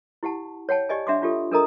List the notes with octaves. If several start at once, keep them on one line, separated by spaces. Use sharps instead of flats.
E4 G4 F#5 A5
C#5 F#5 G5 A5
G4 D5 D#5 G#5
D4 E5 F#5 C6 D6
D4 F4 G4 A4
D4 A4 A#4 D#5 A#5 D#6